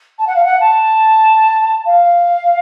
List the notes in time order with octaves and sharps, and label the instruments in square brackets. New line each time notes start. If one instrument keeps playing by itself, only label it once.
[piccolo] A5
F#5
F5
F#5
A5
F5